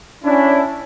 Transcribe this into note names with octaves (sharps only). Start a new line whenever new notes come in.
C#4 D4 E4